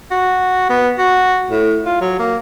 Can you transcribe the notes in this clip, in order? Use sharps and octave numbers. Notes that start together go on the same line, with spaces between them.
F#4
B3
F#4
A2
F4
F#3
A#3